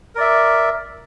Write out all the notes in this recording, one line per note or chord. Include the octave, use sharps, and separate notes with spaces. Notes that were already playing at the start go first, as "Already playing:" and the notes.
A#4 D5 E5